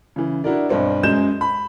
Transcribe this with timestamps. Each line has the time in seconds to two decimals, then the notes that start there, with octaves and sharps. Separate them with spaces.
0.16 C#3 E3
0.44 D4 E4 F#4 A#4 D5
0.69 B1 G2 C4 D5
1.03 F#2 F#3 G#3 G6 E7
1.41 B5